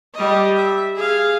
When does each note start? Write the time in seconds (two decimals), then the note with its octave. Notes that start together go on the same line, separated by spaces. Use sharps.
0.13 G3 D#5
0.56 E5
0.96 G#4 F5